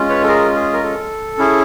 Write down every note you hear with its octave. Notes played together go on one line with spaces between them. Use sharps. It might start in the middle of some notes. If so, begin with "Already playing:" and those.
Already playing: G#3 C#4 F4
B4 C#5
A4
G#4 A#4
G#4
A#4
A4
C#4 E4 G#4